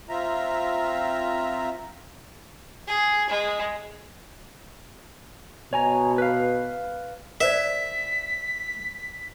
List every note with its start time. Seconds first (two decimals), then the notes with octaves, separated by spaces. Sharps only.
0.09 C4 F4 E5 A#5
2.87 G#4
3.30 G#3
5.73 B2 C#5 G#5 A#5
6.18 B4 F5
7.41 A#4 C5 D5 E5 B6